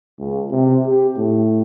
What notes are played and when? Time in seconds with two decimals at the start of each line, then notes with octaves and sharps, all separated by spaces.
0.19 C#2
0.50 C3
0.87 G4
1.17 A2